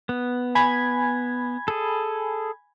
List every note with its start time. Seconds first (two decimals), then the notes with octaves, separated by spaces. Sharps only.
0.09 B3
0.55 G#5 B5 G#6
1.68 G#4 A4